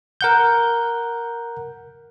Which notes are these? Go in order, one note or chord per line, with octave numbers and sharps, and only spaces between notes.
A#4 F#5 G6